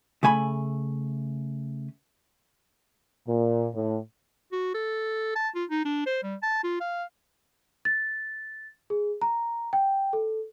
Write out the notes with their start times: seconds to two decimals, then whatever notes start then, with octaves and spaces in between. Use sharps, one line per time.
0.23 C#3 A3 G#5 B5
3.27 A#2
3.75 A2
4.52 F#4
4.74 A4
5.36 A5
5.55 F4
5.70 D#4
5.85 D4
6.06 C5
6.23 G3
6.43 A5
6.64 F4
6.80 F5
7.85 A6
8.90 G#4
9.22 A#5
9.73 G5
10.13 A4